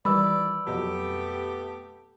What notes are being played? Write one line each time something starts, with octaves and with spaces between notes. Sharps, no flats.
D#3 E3 G3 E4 B4 D5 B5 E6
F2 B2 F#3 A3 B3 G4